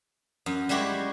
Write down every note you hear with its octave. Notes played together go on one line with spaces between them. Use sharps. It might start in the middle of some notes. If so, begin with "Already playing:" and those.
F#2
G3 G#3 E4 F#4 G4